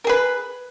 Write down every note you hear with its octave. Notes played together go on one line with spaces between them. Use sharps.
G#4 A#4 B4